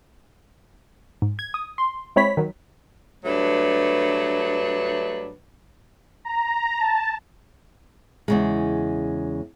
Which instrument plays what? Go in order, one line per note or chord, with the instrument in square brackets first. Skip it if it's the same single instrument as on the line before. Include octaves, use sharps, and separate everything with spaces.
[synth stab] G#2
G#6
D#6
C6
G#3 C4 E4 C#5 B5 B6
D#3 F#3
[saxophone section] G2 F#3 A3 D4 B4
[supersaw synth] A#5
A5
[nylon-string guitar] E2 C#3 G#3